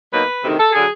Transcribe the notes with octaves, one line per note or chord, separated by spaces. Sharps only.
B2 F#3 A#3 D#4 B4
D2 C3 D#3
A4
D3 F#3 G#4